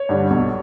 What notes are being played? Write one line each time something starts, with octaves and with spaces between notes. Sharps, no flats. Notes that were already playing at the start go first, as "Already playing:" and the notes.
Already playing: C#5
G2 D3 G3 D4
B1